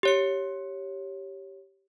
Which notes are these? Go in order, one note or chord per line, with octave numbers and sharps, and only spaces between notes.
G4 C#5 C#7